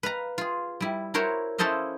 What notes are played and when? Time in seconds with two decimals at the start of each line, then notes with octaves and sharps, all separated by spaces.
0.03 B4 F5 A#5
0.38 F4 G#4
0.80 G3 E4
1.14 E4 F#4 A#4 C5 C#5
1.58 C#4 E4 A4 C5 D#5 F5